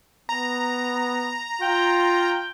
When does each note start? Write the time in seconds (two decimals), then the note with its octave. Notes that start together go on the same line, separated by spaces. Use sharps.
0.29 B3 A#5
1.62 F4 G5